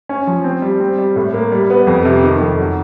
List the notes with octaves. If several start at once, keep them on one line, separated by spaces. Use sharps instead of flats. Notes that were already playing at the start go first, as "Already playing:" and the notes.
C#4
F3
C4
G3
C4
G3
A2
A#3
G3
B3
F2
C3
D#3
F2
F#3